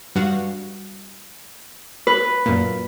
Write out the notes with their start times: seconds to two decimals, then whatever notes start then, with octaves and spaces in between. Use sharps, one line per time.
0.15 G2 F#4 F5
2.07 B4
2.46 F#2 A#2